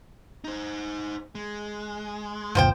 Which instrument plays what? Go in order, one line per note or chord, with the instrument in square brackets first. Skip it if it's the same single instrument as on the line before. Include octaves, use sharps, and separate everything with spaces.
[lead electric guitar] D#4 C5
G#3
[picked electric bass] F#1 D2 B2 [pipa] F3 C5 G5